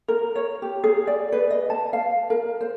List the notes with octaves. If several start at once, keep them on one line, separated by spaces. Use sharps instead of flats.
A#4
C#5
G4
G#4
D5
B4
D#5
A5
F5
A#4
C5